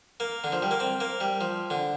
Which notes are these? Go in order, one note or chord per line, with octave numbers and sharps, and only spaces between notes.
A#3
D3
F3
G3
A#3
C4
A#3
G3
F3
D3